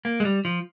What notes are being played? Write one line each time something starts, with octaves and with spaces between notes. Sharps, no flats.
A#3
G#3
G3
F3